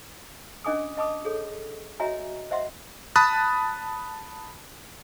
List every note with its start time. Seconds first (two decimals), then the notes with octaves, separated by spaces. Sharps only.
0.64 C#4 D4 D#5 G#5 D6 D#6
0.97 D#5 A5 B5 D6 D#6
1.25 G#4 A4 C#5
2.00 F#4 C#5 D#5 E5 G#5 A#5
2.51 C5 D#5 E5 F#5 C6
3.16 A5 B5 D#6 F#6 A6